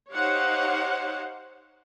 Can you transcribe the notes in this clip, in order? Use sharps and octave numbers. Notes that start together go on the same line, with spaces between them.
D#4 G4 C5 C#5 F5 F#5